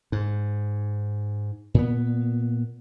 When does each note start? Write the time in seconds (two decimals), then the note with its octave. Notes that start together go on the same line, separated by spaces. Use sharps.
0.12 G#2
1.74 A#2 B3